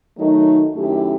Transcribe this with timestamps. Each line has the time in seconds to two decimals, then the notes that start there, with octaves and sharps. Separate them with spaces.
0.17 D#3 F#3 A3 D#4
0.74 F#2 D#3 A3 E4 G4